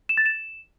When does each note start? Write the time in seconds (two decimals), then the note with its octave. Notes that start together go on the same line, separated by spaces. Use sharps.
0.09 E7
0.17 A6
0.26 E7